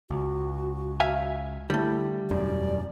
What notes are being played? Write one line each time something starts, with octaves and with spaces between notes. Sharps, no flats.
C#2 F#4
E5 F5 G#5
D3 G3 A3 E4
E1 F#2 D5